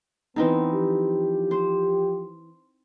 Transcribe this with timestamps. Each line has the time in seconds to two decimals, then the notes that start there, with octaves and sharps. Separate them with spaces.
0.36 E3 B3 C4 D#4
0.72 F3 G4
1.51 C5